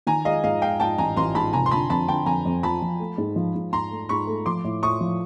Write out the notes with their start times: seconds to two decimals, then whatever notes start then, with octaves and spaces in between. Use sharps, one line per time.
0.07 D#3 G#5 A#5
0.25 G#3 D#5 F5
0.44 G#2 D#5 F5
0.62 G#3 F5 G5
0.80 G#2 G5 A5
0.98 A1 G#5 A#5
1.17 A1 A#5 C6
1.35 G#2 A5 B5
1.53 F1 G#5 A#5
1.66 C6
1.71 D3 A5 B5
1.90 F2 A5 B5
2.08 D3 G5 A5
2.26 F2 G#5 A#5
2.45 F2
2.63 F3 A5 B5
2.82 F3
2.99 A3
3.18 G#2
3.36 F3
3.55 G#2
3.72 G#2 A#5 C6
3.91 A3
4.09 G#2 B5 C#6
4.27 A3
4.46 F3 C6 D6
4.64 A2
4.83 A2 C#6 D#6
5.01 F3